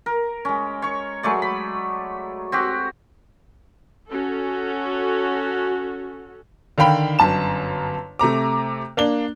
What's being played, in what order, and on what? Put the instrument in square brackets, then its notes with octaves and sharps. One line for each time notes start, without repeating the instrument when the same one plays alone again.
[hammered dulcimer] A#4
G#3 C#4
C#5 C#6
F#3 G#3 A3 D5
B5
C4 F#4 G4
[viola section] C#4 F#4 A4
[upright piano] D3 D#3 F5 G5 B5
G1 F#2 A5 E7
C3 A3 A#5 D6
A#3 D4 G7